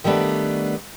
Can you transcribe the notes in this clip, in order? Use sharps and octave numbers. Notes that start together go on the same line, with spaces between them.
D#3 G3 A3 B3 D4